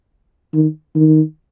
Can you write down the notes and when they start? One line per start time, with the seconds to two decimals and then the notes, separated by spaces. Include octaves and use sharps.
0.54 D#3
0.96 D#3